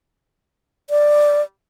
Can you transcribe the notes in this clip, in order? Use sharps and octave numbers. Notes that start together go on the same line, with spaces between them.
D5